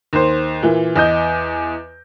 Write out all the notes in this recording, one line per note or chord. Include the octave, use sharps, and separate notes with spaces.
D#2 C5
A#2 E3
E2 D#5 G6